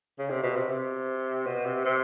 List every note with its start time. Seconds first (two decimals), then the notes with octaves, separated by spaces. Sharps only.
0.19 C#3
0.30 C3
0.43 B2
0.56 C3
0.69 C3
1.46 B2
1.66 C3
1.85 C3